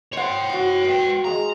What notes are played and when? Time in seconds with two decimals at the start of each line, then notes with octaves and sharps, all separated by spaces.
0.13 C5 C#5 F#5 G5
0.50 F#4 D#6
0.84 B4 G5
1.24 G#3 F5 A#5